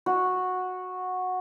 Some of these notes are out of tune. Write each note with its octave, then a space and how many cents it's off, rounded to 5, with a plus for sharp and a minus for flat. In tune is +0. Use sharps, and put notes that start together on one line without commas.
F#4 -10